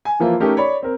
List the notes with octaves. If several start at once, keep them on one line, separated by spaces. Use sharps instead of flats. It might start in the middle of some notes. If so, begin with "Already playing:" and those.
G#5
E3 F3 A#3 E4 F4
A3 C#4 D#4 G4 A#4
C#5 D5 B5
C4 A#4